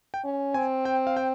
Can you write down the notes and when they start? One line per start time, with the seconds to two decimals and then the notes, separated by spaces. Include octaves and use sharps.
0.14 G5
0.24 C#4
0.54 C4 G#5
0.85 G5
1.07 F5
1.17 G5